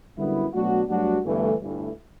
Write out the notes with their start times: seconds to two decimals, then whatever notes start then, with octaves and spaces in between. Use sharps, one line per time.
0.17 F#2 D3 G3 B3 E4
0.53 B2 F#3 A3 D4 F#4
0.89 G2 F#3 A3 D4 F#4
1.25 G1 G2 E3 A3
1.61 G1 G2 E3 A3